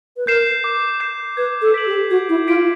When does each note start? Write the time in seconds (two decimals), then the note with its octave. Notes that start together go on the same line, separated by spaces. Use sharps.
0.17 B4
0.27 A#4 G6 C7 E7
0.64 D6
1.00 G6 C7 E7
1.37 B4 G#6
1.62 A4
1.74 B6 D7 F#7
1.86 G4
2.10 F#4 G#6
2.29 E4
2.47 F4 B6 D7 F#7